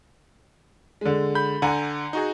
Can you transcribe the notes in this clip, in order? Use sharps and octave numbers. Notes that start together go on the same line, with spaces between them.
D3 G#3
B5 G6
D3 F#5 G#5 A#5
D#4 F#4 G#4